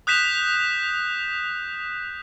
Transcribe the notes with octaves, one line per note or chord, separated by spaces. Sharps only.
D#6 F#6 G6 B6 E7 F7